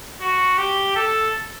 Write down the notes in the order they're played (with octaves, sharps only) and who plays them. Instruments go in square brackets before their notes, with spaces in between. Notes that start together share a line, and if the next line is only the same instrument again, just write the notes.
[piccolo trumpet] F#4
G4
A4